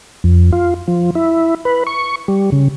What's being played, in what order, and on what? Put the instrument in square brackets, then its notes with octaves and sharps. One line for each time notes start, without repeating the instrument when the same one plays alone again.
[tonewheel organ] F2
F4
F3
E4
B4
C#6
G3
C#3